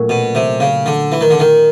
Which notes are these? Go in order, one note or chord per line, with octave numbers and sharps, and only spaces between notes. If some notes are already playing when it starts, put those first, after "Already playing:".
Already playing: A#2 F#3 A3 C#4
B2
C3
C#3
D3
E3
D#3
D3
D#3